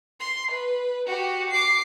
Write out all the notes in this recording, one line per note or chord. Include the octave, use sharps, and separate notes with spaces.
C6
B4
F#4 G4
D6 C7